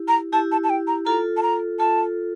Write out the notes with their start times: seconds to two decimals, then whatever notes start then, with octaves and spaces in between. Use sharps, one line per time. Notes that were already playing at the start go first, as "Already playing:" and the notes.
Already playing: E4 G4
0.08 A#5
0.33 E4 G4 A5
0.52 A5
0.64 A5
0.70 G5
0.87 A#5
1.06 F4 A4 A#5
1.37 A5
1.43 A#5
1.79 F4 A4 A5